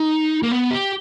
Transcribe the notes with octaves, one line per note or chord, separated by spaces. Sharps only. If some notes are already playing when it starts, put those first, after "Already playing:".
Already playing: D#4
A#3
B3
G4